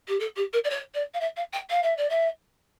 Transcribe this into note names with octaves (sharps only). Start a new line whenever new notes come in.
G4
A4
G4
A#4
D5
C#5
D5
F5
E5
F5
G5
F5
E5
D5
E5